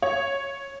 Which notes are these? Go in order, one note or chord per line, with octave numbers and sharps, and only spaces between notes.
C#5